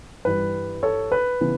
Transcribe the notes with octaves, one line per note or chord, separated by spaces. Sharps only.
G2 E3 G3 B4
A4 C#5
B4
C#3 E3 B3